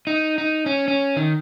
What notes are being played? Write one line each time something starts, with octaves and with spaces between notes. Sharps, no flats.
D#4
D#4
C#4
C#4
D#3